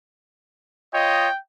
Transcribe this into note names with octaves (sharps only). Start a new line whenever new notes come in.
F4 C#5 D#5 G5